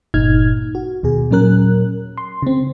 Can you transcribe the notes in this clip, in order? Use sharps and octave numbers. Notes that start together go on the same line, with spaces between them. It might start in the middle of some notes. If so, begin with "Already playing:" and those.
G1 A#2 D#4 F6 G#6
F#4
D#2 B2 G#4
A#2 F#3 C#4 A#4 F#6
C6
C#3 C4